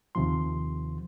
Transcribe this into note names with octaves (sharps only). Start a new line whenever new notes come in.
D#2 C3 D#3 F3 C6